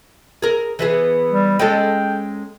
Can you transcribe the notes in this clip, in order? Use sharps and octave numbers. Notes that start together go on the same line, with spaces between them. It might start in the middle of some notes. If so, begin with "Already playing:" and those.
G#4 A#4
E3 B3 G#4
G3
G#3 C#4 A4 G5